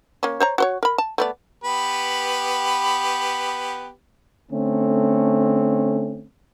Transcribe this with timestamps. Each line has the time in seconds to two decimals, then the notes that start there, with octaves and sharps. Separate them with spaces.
0.23 A#3 C#4
0.40 C5 C#5 A#5
0.58 F#4 C5 C#5
0.83 A#4 B5
0.98 A5
1.18 A3 B3 D5
1.64 B3 G4 B4
4.51 D3 A3 C4 C#4